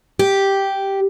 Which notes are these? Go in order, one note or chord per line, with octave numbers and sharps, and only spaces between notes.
G4